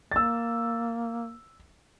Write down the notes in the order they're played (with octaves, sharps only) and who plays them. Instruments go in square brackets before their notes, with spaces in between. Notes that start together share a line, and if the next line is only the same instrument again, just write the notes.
[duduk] A#3 [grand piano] E6 A6